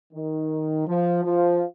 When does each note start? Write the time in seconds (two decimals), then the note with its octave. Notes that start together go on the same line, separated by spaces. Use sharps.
0.13 D#3
0.87 F3
1.24 F3